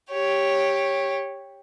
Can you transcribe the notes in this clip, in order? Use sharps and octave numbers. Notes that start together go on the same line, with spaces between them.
G4 C#5